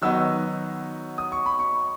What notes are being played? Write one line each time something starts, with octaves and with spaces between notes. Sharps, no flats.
D#3 F#3 B3 D#4 E6
D#6
C#6
B5
C#6